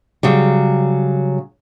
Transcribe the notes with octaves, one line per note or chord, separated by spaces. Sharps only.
C#3 F#3 G3